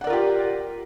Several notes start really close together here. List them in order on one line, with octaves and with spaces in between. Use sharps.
F#5 D5 A#4 F4 G4